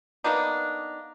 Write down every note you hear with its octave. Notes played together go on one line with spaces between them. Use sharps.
A#3 B3 D4 D#4